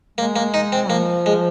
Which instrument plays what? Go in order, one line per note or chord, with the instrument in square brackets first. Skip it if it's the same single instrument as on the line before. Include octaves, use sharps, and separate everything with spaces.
[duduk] G#3 [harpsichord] A#3
[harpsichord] A#3
D#4
C4
[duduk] F3 [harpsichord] A#3
[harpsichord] G#3